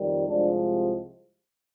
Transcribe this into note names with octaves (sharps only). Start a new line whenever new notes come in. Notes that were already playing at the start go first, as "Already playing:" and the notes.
Already playing: F2 D#3 G3
C2 C3 F3 G#3 D4